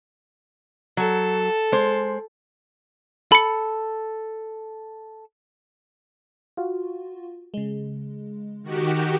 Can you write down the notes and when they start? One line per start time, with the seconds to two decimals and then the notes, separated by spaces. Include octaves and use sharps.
0.97 F#3 A4
1.72 G#3 C5
3.32 A4 B5 C#7
6.57 F4 F#4
7.54 C#3 G#3
8.63 D#3 F#4 G4